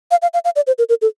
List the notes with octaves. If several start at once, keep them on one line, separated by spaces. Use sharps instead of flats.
F5
F5
F5
F5
D5
C5
A#4
A#4
A4